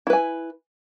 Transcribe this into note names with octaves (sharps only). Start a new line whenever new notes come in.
E4 B4 G#5